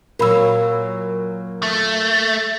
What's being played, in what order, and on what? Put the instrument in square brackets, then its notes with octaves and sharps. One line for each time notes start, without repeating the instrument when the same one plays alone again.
[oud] A#2 F#3 [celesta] A#4 B5 E6
[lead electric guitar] A3